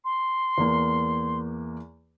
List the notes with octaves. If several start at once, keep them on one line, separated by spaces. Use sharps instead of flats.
C6
E2 A#3